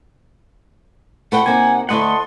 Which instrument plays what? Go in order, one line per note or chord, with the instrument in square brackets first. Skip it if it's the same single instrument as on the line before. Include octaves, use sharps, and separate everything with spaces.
[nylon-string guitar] A3 B4 G5 [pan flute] F#5
[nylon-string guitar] C3 A#3 D#4 [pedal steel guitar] G#5
[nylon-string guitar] D2 A3 E4 [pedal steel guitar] A4 D#5 F#5 [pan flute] C6